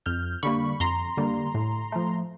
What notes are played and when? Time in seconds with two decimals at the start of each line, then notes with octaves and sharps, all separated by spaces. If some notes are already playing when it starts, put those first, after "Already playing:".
0.06 F2 F6 G6
0.43 D3 G3 A#3 B5 C#6
0.80 F2 A#5 C6
1.17 D3 G3 A#3
1.54 A2
1.92 F3 A3